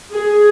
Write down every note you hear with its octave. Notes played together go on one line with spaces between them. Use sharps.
G#4